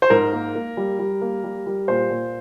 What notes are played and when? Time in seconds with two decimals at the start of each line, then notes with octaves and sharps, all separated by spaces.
0.02 C5
0.10 G#2 A#4
0.32 A#3
0.55 A#3
0.77 G3
0.99 G3
1.21 A#3
1.44 G3
1.66 G3
1.88 A#2 C5
2.10 A#2